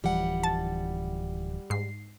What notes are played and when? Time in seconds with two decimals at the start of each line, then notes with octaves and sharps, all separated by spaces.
0.04 D1 E3 F3 G3 F#5
0.43 A5 A6
1.70 G#2 C7